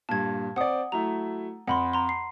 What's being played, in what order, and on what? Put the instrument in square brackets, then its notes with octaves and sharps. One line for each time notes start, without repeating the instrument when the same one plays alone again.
[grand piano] G2 A#2 [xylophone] A5 G#6
[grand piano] C4 D5 [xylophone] F#5 D#6
[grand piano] F#3 A3 E4 [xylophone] A#5
[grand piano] F2 [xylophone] F#5 B5 C6
[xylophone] A#5 C6
C7